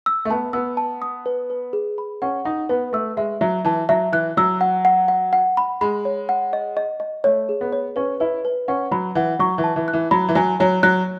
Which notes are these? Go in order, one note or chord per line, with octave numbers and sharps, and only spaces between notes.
E6
A3
B3 A5
B3 E6
A5
D#6
B4
B4
G#4
B5
C#4 F#5
D#4 F#5
B3 B4
A3 E6
G#3 E5
F#3 E5
E3 A5
F#3 E5
E3 F#6
F#3 E6
F#5
F#5
F#5
F#5
B5
G#3 B5
C#5
F#5
D#5
D#5
D#5
A3 C#5
G#4
B3
C#5
C#4 B4
E4 B4
B4
C#4 F#5
F#3 B5
E3 F#5
F#3 C#6
E3
A5
E3
F#6
E3
F#3 B5
E3
F#3 G#5
F#3 C#5
F#3 F#6